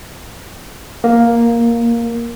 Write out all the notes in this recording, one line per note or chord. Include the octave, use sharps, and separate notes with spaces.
A#3